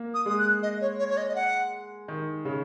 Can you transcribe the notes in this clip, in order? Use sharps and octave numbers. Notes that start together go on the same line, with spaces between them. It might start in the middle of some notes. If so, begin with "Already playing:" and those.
Already playing: A#3
D#6
G#3 D#6
F#6
D#5
C#5
C#5
C#5
D#5
D#5
F#5
D#3
C#3